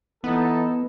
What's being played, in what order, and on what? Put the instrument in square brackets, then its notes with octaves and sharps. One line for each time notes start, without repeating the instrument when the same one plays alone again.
[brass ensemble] E3 D#4 A4 [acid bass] B3